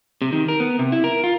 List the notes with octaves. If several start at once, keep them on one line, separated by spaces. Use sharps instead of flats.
C3
D#3
A#4
B3
C3
E4
A#4
F4